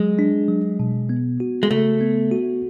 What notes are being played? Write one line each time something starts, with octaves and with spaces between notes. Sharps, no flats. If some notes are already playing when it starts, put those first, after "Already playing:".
Already playing: F#3 G#3
D4
F#3
B2
B3
F#4
G#3
C#3 A3
B3
F#4